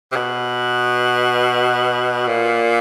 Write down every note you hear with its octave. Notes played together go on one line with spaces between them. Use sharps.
C3
B2
A#2